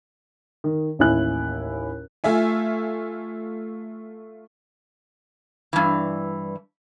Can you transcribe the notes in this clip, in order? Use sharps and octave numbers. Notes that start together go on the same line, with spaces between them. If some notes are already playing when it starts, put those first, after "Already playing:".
D#3
A1 D#2 E4 G#5 F#6
A3 F4 E5 G#5
G2 E3